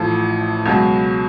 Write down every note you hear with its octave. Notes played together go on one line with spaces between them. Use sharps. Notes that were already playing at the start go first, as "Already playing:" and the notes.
Already playing: A1 A2 F3
C#2 B2 F#3